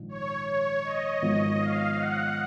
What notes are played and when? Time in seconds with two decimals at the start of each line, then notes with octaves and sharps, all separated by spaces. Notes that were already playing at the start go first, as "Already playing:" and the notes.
Already playing: A#1 G#2 D#3
0.09 C#5
0.47 C#5
0.84 D#5
1.22 G#1 G#2 F3 B3
1.59 F5
1.97 F#5